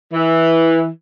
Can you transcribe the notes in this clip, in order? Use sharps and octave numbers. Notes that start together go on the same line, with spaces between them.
E3